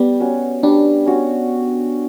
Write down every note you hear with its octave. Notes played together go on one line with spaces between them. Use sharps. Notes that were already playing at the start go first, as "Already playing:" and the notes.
Already playing: G3 B3
C#4 F#4
G3 D4
C#4 F#4